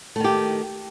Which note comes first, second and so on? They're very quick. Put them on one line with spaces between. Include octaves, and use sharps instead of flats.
A3 D#3 G4